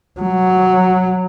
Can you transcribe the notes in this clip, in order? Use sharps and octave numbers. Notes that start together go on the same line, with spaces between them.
F#3